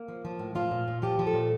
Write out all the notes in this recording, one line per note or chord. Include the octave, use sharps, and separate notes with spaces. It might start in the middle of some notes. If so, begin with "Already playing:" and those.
Already playing: A#3
F3
F3
A2
F3 F4
A#2
A#2
F3 G4
F3
A4
A#2